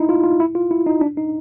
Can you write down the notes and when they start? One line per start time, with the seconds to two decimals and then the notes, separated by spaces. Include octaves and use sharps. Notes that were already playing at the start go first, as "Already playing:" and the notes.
Already playing: D#4 E4
0.09 F4
0.24 F4
0.40 E4
0.55 F4
0.71 E4
0.86 D#4
1.01 D4
1.17 D#4